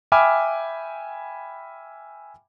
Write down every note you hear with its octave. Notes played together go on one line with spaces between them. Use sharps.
E5 G5 G#5 B5 D6 F6